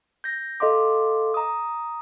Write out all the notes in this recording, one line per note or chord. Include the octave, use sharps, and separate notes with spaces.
G6 A#6
A4 D#5 F5 C6 D6
A#5 D#6